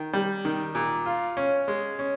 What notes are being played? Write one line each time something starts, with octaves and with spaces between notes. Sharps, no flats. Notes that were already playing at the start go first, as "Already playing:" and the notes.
Already playing: D#3
G3
D#3
A#2
F4
C#4
G#3
C#4